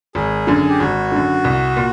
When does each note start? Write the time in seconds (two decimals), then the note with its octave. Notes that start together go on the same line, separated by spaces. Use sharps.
0.15 G#1 G#4
0.47 F#2 D3
0.69 G4
0.80 G#1 F#4
1.12 F#2 D3
1.44 C2
1.77 A#2